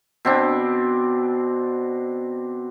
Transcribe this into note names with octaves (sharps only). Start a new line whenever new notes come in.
B2 C4 D4